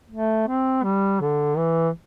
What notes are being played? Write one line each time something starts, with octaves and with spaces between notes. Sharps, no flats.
A3
C4
G3
D3
E3